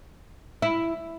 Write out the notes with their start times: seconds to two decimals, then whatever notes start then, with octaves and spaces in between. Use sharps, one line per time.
0.62 E4